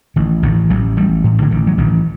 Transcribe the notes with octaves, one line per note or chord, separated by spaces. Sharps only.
A1 D#3
A1 D#3
A1 F#3
A1 G3
A2
D3
A1 D#3
F#3
A1 D#3